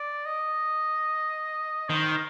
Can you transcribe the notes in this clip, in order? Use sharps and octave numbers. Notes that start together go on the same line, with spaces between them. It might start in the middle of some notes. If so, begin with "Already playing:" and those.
Already playing: D5
D#5
D#3 C5